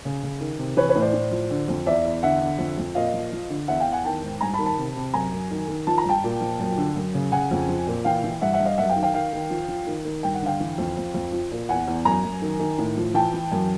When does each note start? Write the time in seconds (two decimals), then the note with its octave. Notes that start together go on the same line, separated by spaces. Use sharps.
0.05 C#3
0.23 C#3
0.40 D#3
0.58 C3
0.77 E3 B4 C#5
0.89 B4 C#5
0.95 A2
1.01 C5 D5
1.13 A2
1.31 F3
1.51 D3
1.68 F2
1.86 E2 D5 E5
2.05 E2
2.23 D3 E5 F#5
2.41 D3
2.59 F2
2.78 F2
2.95 A#2 D#5 F5
3.13 F3
3.32 F3
3.50 D3
3.68 E2 E5 F#5
3.80 F5 G5
3.87 E2
3.92 F#5 G#5
4.04 D#3 G5 A5
4.23 G#2
4.41 G2 G#5 A#5
4.54 A5 B5
4.59 D#3
4.65 A5 B5
4.78 C3
4.96 C3
5.14 F#2 G#5 A#5
5.32 F#2
5.51 D#3
5.68 D#3
5.87 F3 A5
5.98 A#5
6.04 G2 G5 A5
6.24 A#2
6.41 F3
6.59 F#2
6.77 D3
6.96 F#2
7.14 C#3
7.32 C#3 F#5 G#5
7.51 F2
7.68 F3
7.87 A#2
8.05 E3 F5 G5
8.23 E3
8.41 G2 E5 F#5
8.53 E5 F#5
8.59 G2
8.65 D#5 F5
8.78 F#2 E5 F#5
8.89 F5 G5
8.96 D#3
9.03 F5 G5
9.14 D#3 F5 G5
9.33 D#3
9.50 F3
9.68 F3
9.87 D#3
10.05 D#3
10.23 G2 G5
10.35 F#5
10.42 D3 F5 G5
10.60 E3
10.78 F2
10.97 F2
11.14 F2
11.32 F3
11.51 A#2
11.69 E2 F#5 G#5
11.88 E2
12.05 F#2 G#5 A#5
12.24 F#2
12.42 D#3
12.59 D#3
12.78 A2
12.97 F3
13.14 E3 G5 A5
13.33 E3
13.52 F#2